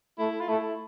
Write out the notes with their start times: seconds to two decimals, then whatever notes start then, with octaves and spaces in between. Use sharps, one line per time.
0.19 A3 E4
0.41 F4
0.48 A3 E4